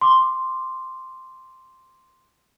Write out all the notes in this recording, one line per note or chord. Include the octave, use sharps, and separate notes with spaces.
C6 D6